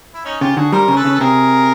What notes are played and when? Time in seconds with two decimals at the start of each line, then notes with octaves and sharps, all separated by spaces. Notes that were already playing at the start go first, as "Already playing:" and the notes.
0.14 E4
0.25 C#4 D#4
0.41 C#3 F4 G4
0.56 D3 F#4 G#4
0.72 G3 A#4 C5
0.88 C#3 C5
0.96 A4 B4
1.05 C#3
1.15 A4
1.20 C3 G#4 A#4